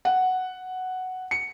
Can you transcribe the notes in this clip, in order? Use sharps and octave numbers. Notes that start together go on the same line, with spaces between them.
F#5
C#7